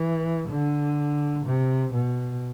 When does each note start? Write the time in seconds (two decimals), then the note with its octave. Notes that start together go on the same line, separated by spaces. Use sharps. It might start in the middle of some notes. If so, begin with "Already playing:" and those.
Already playing: E3
0.49 D3
1.45 C3
1.93 B2